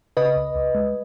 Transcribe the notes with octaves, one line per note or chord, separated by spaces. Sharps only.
C#3 B4 D#5
C#2
C#2
G#3